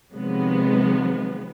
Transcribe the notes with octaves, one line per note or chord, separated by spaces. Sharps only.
C3 D#3 F3 F#3 G#3 B3